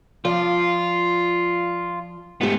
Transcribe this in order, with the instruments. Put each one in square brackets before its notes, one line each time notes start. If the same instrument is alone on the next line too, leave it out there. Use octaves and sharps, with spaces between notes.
[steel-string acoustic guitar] F3 D5 [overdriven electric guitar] F4
[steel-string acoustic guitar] G#2 G4 [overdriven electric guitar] A3 B3